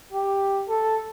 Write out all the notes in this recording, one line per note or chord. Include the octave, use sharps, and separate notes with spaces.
G4
A4